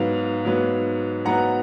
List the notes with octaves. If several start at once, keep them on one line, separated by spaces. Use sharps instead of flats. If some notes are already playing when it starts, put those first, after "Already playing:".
Already playing: G#2 F#3 B3 F5
G#2 F#3 B3
G#2 F#3 B3 F#5 A#5